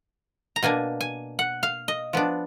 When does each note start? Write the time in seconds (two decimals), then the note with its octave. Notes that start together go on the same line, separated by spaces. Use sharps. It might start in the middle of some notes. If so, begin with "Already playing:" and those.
0.56 A#5
0.63 B2 A#3 D4 G#5
1.01 G#5
1.39 F#5
1.63 F5
1.88 D#5
2.13 F3 B3 D4